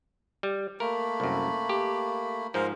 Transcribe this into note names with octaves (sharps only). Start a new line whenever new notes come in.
G3
A3 A#3 A#4 B5
C2 F#2
G4
G#2 F3 A#4 C5 A#5